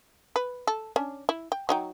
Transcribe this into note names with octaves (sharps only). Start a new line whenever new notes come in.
B4
A4
C#4 D4
E4
G5
F#3 D#4 G5